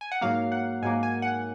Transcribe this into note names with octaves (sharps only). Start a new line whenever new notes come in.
G#5
F#5
G#2 F#3 A#3 F5
F#5
G#2 F#3 A#3 G#5
G#5
F#5